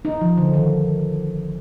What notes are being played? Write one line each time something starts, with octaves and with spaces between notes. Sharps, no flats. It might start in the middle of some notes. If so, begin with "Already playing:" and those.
D#4
F3
D3
D#3